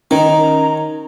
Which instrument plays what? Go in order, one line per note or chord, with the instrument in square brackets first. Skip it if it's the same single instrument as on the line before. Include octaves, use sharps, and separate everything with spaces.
[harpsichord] D#3 [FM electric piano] C#4 [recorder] A#5